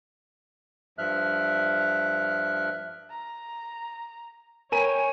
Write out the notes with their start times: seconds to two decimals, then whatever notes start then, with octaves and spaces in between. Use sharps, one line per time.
0.98 G2 F3 E5 F6 F#6
3.10 A#5
4.72 A#4 C#5 G5 G#5 B5 D#7